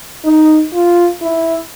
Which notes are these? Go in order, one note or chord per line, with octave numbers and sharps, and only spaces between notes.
D#4
F4
E4